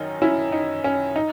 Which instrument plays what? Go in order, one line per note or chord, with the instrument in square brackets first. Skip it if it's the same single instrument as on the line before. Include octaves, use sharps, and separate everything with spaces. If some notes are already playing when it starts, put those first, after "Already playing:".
Already playing: [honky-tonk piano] F#2 D#3 C#4 D#4
C#4 E4
D#4
C#4
D#4